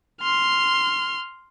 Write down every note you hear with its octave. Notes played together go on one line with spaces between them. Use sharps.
C6 F6